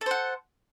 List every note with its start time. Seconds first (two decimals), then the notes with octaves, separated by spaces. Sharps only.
0.01 A4
0.06 C5
0.11 F#5